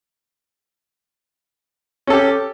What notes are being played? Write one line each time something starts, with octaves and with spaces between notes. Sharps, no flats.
C#4 G4 A4